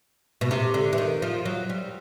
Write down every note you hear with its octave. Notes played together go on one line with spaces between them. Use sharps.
B2
C3
D3
E3
D#3
F3
F#3
G3